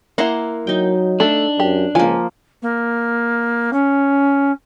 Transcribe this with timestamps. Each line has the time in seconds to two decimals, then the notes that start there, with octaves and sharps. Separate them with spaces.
0.18 A#3 E4 F#5 A#5 C6
0.67 F#3 D#4 G5
1.20 A3 D4 A4
1.60 F#2 G4
1.95 C#2 F3 A#3 G#5
2.62 A#3
3.73 C#4